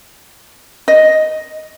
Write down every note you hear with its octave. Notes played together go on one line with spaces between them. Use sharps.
D#5